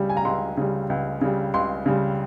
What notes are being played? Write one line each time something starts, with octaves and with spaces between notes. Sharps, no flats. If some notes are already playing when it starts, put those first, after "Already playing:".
Already playing: C#2 C#3 G3
G#5
A#5
C#2 C6
C#3 G3
C#2
C#3 G3
C#2 C6
C#3 G3